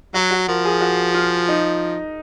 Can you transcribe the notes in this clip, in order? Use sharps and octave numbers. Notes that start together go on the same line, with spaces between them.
F#3 F#4
F#4
F3 A#4
G#4
F#4
F4
D#4